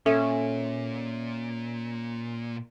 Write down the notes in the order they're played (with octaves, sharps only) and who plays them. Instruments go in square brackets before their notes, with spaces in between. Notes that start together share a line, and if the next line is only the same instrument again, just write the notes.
[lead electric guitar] A#2 [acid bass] C#4 [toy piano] A4 [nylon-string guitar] E5